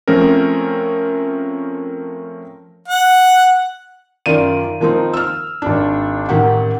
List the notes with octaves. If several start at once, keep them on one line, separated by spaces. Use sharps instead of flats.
F3 A3 C4 C#4 A#4
F#5
F#2 D#3 F4 D5 D#7
D#3 F3 A#3 C4 D#4
E6 F6
G#1 D4
A1 D#3 G4 F#5